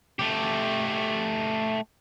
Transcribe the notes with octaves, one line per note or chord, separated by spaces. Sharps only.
A3 G4